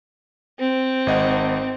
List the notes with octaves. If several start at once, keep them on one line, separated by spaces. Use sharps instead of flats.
C4
G#1 D#5 F#5